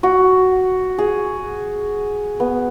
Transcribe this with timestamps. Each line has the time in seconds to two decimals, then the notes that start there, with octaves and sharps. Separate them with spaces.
0.03 F#4
0.98 G#4
2.40 B3